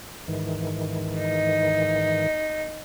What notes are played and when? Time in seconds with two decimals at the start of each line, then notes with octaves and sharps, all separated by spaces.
0.28 G#2 D#3 E3
1.19 D#4